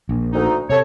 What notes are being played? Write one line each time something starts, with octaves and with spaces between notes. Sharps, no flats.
A#1
D2 D#4
C3 A4 C#5